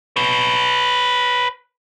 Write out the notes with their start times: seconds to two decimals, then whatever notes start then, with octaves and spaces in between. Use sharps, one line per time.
0.16 B4 C#5